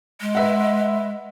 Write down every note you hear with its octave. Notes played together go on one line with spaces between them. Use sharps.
G#3
B4 E5 F#5